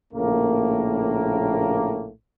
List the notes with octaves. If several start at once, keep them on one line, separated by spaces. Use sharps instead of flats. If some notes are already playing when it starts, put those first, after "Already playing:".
A#1 A2 C#3 A#3